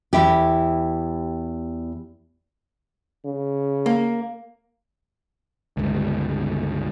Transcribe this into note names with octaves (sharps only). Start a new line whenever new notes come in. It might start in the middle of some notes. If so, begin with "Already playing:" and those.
E2 E4 G4
C#3
A#3
G1 C#2